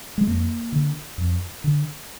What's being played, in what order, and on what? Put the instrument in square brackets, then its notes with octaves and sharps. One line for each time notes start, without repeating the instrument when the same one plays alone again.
[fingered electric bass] G#3
F2 A#3
D3
F2
D3